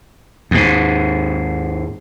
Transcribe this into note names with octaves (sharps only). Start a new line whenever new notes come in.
D#2 G#2